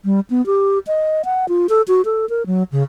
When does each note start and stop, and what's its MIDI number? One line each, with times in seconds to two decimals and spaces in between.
0.05 0.20 55
0.30 0.44 59
0.46 0.79 67
0.87 1.22 75
1.25 1.48 78
1.49 1.67 65
1.69 1.82 69
1.88 2.02 66
2.05 2.29 69
2.29 2.46 70
2.46 2.63 54
2.72 2.83 49